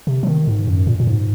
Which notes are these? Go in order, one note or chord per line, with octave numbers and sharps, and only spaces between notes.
C3
F3
D#3
G#2
F#2
A#2
A#2
G#2